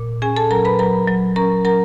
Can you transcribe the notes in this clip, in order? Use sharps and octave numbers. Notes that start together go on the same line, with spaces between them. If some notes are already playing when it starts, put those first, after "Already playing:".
Already playing: A#2
C#4 G#4 G#5
A4 A5
F#3 A#4 A#5
B4 B5
F#3 A#4 A#5
F#3
C#4 A#4 A#5
F#3 A#4 A#5